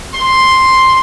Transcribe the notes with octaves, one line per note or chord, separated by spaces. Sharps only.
C6